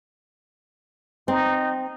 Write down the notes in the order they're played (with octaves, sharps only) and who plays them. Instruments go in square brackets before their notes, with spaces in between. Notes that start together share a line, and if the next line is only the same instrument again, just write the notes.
[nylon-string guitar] C4 [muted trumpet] D#4